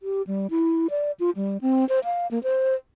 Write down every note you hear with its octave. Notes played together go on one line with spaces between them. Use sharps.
G4
G3
E4
D5
F4
G3
C4
C5
F5
A#3
C5